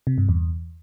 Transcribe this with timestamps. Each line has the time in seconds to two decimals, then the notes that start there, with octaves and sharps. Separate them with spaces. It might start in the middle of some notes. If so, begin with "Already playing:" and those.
0.07 C3
0.18 G2
0.29 E2